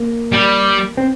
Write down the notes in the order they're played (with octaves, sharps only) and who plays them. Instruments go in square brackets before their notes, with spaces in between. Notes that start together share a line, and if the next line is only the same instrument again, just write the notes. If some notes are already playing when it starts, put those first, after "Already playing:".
Already playing: [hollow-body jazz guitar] A#3
[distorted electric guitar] G3
[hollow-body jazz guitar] C4